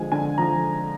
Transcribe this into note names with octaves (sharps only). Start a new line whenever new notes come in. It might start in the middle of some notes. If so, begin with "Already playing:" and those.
Already playing: D3 F3 G#3 G#5
D3 G#5
F3 A#5